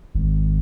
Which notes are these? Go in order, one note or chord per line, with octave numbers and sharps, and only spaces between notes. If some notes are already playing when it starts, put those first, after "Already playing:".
G#1